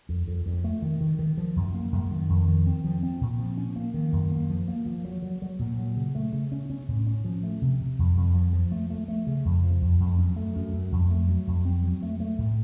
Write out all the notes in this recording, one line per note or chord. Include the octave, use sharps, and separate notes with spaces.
F2
F2
F2
A3
D#3
D#3
D#3
F3
F#2
A#3
F#2
D#3
F2
D#3
C4
F3
C4
A#2
F3
C#4
A#3
D#3
F#2
A#3
F3
A#3
F3
F#3
F#3
F#3
A#2
F#3
C#3
A3
C#3
C#4
C#4
A2
C#4
F3
A3
C3
C3
F2
F2
F3
F3
A3
A3
A3
C#3
F2
F3
F2
F2
F#2
A3
F#2
F#2
F2
A3
F#3
F2
C4
F#3
A3
A3
A2